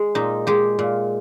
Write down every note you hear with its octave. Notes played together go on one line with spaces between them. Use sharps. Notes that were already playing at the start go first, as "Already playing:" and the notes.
Already playing: G#3
A#2 D#4
G#3 G4
A#2